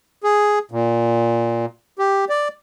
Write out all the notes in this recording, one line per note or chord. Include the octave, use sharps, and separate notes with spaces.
G#4
A#2
G4
D5